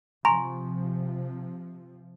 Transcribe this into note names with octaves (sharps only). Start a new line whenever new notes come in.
C3 F3 G#5 A#5 C6 C#6